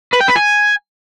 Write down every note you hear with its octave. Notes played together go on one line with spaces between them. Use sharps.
B4
G5
B4
G#5